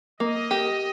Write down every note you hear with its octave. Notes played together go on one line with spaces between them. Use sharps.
A#3 D#5
G4